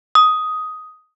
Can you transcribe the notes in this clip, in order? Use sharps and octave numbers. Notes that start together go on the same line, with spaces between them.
D#6